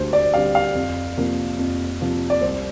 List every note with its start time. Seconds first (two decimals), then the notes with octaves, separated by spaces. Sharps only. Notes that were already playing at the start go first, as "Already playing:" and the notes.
Already playing: D2 D3 G3 C5
0.13 D5
0.33 D3 G3 C4 F5
0.55 F5
0.75 F2
1.17 C3 F3 A#3
1.59 F2
2.01 C3 F3 A#3
2.30 D5
2.41 C2 C5